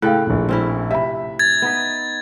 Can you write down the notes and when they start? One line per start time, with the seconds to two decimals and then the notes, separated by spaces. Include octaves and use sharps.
0.02 A2 C#3 A4 F5 G5 F#6
0.27 A#1 A#2
0.49 C4 C#4 E4
0.91 C3 E5 B5
1.39 G#6 A6
1.62 B3 D#4 B4